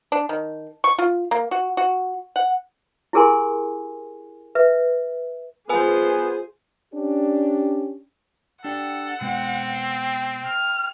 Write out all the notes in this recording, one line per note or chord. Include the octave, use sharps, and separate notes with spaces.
D4
D#3
C#6
F4
A#3
F#4
F#4
F#5
E4 G4 G#4 A#4 G#5 C6
B4 E5
B3 F4 G#4 B4 C5 G#5
C#4 D4 G4
D4 G4 A4 D5 F#5 G5
B2 G#3 B3 C4 G5
F6